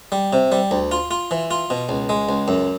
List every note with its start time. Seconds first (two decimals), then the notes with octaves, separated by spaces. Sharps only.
0.12 G3
0.33 C3
0.52 G3
0.71 D2
0.91 F4
1.11 F4
1.31 E3
1.51 F4
1.70 B2
1.89 C#2
2.09 G#3
2.29 C#2
2.48 F#2